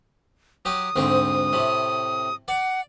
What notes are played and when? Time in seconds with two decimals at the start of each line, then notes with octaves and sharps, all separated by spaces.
0.65 F#3 G4 D#6
0.96 D2 G#2 C4
1.53 A2 C3
2.48 D5 F#5